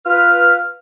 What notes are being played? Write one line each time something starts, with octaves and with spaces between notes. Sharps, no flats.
F4 B4 F6